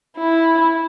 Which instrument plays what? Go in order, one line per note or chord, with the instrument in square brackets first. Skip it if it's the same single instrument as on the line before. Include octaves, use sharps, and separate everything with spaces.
[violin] E4